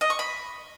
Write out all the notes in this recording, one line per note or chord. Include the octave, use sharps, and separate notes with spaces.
D#5
C#6
B5